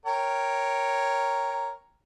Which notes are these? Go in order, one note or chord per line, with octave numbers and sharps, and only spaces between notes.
A#4 C#5 G5